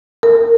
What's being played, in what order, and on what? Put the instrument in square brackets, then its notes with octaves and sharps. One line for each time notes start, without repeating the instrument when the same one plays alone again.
[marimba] A#4